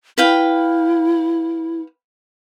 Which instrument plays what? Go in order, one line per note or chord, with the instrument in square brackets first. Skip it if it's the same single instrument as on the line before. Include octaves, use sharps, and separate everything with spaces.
[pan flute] E4 [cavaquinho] B4 F5 G5